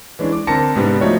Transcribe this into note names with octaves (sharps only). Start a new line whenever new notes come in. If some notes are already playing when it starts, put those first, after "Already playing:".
E3 G#3 C#4 D4
D6
D3 C4 A#4 A5 A#6 C#7
G#2 C3 G3 B3 D4
F3 A3 D#4 F#4 C#5